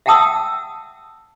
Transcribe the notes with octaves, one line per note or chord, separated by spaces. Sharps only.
E5 F#5 G5 A5 D#6 E6